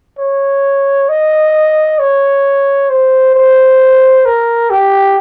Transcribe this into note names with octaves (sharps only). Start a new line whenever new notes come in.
C#5
D#5
C#5
C5
C5
A#4
G4